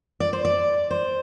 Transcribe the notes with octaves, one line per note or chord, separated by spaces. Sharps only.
D5
C5
D5
C5